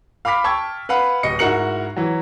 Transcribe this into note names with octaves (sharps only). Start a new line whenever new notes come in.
F5 B5 D6 F6 B6
G5 A5 C#6 E6 G#6
B4 F5 F#5 B5
D1 D#5 C#7
G#2 E4 F#4 A#4 C#7 F#7
E3 F#3